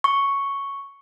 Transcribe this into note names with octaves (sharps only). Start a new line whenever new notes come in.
C#6